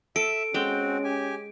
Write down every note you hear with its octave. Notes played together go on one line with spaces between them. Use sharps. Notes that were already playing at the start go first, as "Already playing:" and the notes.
A4 E5 D7
G#3 C4 C#4 F#4 G5
G4 G#5